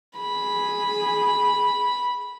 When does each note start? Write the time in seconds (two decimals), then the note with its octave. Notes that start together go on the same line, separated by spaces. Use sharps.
0.19 G#4 B5